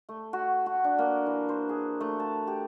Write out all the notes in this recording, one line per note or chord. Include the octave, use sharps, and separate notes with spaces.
A3
F#4
F#4
D4
A#3
E3
C5
G#4
A3
A5
G4